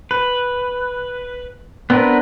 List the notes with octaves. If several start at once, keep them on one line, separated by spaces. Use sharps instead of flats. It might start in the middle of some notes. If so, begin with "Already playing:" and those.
B4
B3 C4 D4 A#4 B4